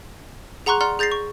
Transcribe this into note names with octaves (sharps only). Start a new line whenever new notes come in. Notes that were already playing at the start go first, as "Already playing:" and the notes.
G#4 F#5 A#5 C6 C#6 F#6
D5 F#5 A#5 C6 F6
G#4 G6 A6 A#6 C7
C#6